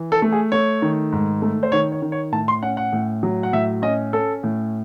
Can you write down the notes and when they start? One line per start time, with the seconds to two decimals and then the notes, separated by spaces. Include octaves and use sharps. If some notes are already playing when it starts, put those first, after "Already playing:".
Already playing: E3
0.12 A4
0.22 A3
0.32 G#4
0.52 A3 C#5
0.82 D#3
1.12 G#2
1.42 A3
1.63 C5
1.72 D#3 C#5
1.92 C#5
2.02 D#3
2.12 C#5
2.32 A2 A5
2.48 C6
2.62 C#4 F#5
2.77 F#5
2.93 A2
3.23 F#3
3.43 F#5
3.53 A2 E5
3.82 C#4 D#5
4.13 C#4 A4
4.43 A2